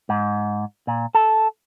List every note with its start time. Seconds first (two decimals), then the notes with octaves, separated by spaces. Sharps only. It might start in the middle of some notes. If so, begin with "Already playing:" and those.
0.09 G#2
0.87 A#2
1.15 A4